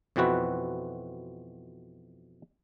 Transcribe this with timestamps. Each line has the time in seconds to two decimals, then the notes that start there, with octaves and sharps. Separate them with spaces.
0.16 F2 B2 E3 C4 F#4 B4